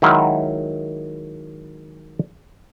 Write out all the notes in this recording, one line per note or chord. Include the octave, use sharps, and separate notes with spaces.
D#3 F#3 G#3 E4 F5 F#5